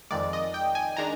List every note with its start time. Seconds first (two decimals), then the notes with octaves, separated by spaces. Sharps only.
0.11 F2 D#3 G#3 D5
0.33 D#5
0.54 G5
0.75 G#5
0.97 D#3 G#3 D4 A#5